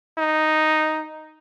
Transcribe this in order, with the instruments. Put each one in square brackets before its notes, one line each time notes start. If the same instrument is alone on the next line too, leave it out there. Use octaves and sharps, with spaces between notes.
[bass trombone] D#4